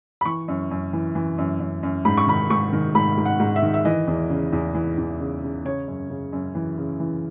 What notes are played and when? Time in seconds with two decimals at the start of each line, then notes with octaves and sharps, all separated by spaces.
0.21 B5
0.25 E3 C#6
0.48 F#2
0.71 F#2
0.93 E3
1.15 E3
1.38 F#2
1.60 F#2
1.83 F#2
2.05 G#2 B5
2.18 C#6
2.28 D#3 B5
2.50 G#2 C#6
2.73 D#3
2.95 G#2 B5
3.18 G#2
3.25 F#5
3.40 G#2
3.56 E5
3.62 D#3
3.74 E5
3.85 E3 D#5
4.07 E2
4.30 C#3
4.53 E2
4.75 E3
4.98 E2
5.20 C#3
5.42 C#3
5.65 C#3 C#5
5.88 F#2
6.10 C#3
6.33 F#2
6.55 E3
6.78 C#3
7.00 E3